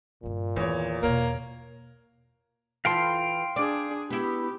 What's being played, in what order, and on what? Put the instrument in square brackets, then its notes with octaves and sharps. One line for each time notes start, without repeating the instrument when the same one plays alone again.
[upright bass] G2 D3 [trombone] A#2
[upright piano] E2 C#5 [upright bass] D#3
[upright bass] E2 B2 [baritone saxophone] A#3 [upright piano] A#4 C#5
[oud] E3 F4 A4 [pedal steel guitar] F5 G5 C6
[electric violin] D4 G#4 [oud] D5
[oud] B3 E4 [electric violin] G4